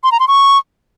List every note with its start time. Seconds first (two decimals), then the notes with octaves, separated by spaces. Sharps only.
0.03 C6
0.12 A#5
0.20 C6
0.28 C#6